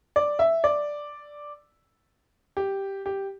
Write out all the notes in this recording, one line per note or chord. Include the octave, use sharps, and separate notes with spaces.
D5
E5
D5
G4
G4